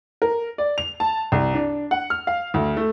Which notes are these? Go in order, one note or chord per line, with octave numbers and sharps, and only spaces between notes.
A#4
D5
F7
A5
C2
D4
F#5
F6
F5
D2
A3